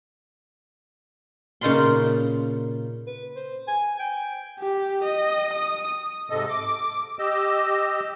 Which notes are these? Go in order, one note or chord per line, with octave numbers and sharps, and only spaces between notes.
A#2 C#3 D#4 F4 B5 C6
B4
C5
G#5
G5
G4
D#5
D#6
G#2 C3 A4 D#5
D6
G4 D#5 E6